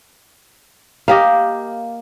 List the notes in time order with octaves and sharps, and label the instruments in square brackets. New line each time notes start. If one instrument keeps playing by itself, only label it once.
[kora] A#3 G4 D#5 [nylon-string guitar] F5